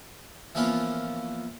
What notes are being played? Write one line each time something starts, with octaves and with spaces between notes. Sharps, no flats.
E3 F3 A#3 B3 C#4 F4